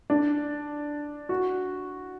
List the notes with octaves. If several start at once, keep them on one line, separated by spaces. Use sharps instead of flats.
D4
F#4